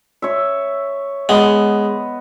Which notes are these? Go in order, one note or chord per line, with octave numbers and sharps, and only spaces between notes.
C#5 E5
G#3 B3 D#5